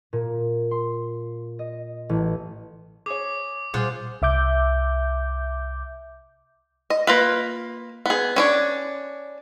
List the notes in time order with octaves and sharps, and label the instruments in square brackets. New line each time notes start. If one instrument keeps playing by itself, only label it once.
[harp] A#2
C6
D#5
A1
[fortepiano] G#4 C#5 [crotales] D6
[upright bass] A#2 G3 [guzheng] F4 C5 F#5 [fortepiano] G#4 D6
[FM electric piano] C2 E5 D6 G6
[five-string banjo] D#5
A#3 F4 B4
B3 G#4
C#4 D4 C#5